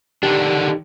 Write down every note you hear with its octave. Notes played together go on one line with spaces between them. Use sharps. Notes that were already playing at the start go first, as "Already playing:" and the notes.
D3 D#3 D4 G4